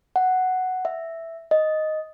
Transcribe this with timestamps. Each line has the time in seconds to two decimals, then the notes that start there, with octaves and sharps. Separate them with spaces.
0.16 F#5
0.85 E5
1.51 D#5